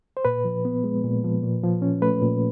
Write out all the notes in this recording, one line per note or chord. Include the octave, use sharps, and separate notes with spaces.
C5
A#2 B4
F3
B3
G#3
A#2
F3
A#2
F3
C#4
A3 B4
A#2